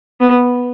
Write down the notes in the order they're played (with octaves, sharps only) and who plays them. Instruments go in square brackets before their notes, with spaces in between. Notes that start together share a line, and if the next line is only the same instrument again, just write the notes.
[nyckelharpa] B3